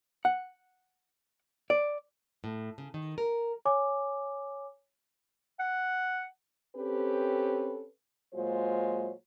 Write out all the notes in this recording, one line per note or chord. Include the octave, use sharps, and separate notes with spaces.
F#5
D5
A2
C#3
D#3
A#4
C#5 G#5 D6
F#5
C4 C#4 G4 A4 B4
A#2 F#3 G#3 F4 C5